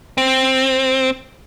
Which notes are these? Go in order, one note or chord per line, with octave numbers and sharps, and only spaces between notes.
C4